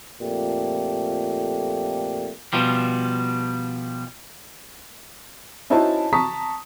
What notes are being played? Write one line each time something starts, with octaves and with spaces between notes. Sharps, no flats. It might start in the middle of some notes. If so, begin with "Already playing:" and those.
F2 A#2 A3 G4
B2 F3 G3
C#4 D#4 E4 F#4 C5 A5
A5 A#5 C#6 D#6 B6